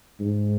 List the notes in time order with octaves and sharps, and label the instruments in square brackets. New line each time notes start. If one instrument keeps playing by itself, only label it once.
[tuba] G#2